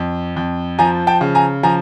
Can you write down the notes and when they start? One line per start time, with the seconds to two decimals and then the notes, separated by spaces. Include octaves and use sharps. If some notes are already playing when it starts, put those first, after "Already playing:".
Already playing: F2
0.36 F2
0.79 F3 G#5 A#5
1.07 G5 A5
1.21 C#3
1.35 G#5 A#5
1.63 F3 G#5 A#5